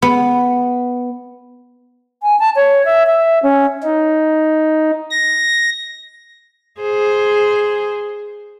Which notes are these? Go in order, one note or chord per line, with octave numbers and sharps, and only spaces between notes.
B3
G#5
A5
C#5
E5
E5
C#4
D#4
A#6
G#4 C5